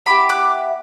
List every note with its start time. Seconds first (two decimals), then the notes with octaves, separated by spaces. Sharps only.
0.06 B3 E4 G4 B5 D6
0.29 D6 F#6